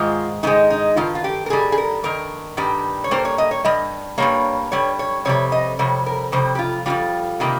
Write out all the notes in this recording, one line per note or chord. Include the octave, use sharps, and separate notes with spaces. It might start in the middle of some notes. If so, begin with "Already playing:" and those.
Already playing: G#2 D#3 G#3 F4
G#2 D#3 G#3 D#4
D#4
G2 D#3 F4
F4
G4
A#4
G2 D#3 G3 G#4
G#4
A#4
G2 D#3 A#4
G2 D#3 G3
C#5
G2 G3 A#3 C5
C#5
D#5
C#5
G2 G3 D#5
G2 G3 A#3 C#5
G2 G3 C#5
C#5
F2 C3 G3 C#5
D#5
F2 C3 G3 C#5
A#4
F2 C3 G3 C5
G4
F4
F2 C3 G3 F4
C3 D#3 G3 A#3